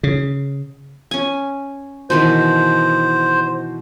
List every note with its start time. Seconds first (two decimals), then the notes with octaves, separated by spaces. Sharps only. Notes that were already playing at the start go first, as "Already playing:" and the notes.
0.03 C#3
1.11 C#4 G#5
2.10 B2 D#3 E3 C5